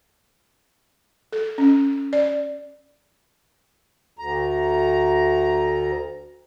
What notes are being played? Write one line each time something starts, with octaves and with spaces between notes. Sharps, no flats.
A4
C#4
D5
D2 A#5